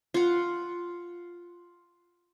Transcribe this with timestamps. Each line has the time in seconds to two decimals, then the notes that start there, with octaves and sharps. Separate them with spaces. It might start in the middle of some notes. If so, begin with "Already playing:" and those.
0.14 F4 F#5